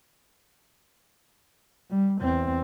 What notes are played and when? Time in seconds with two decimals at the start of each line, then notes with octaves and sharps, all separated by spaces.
1.90 G3
2.21 E2 C4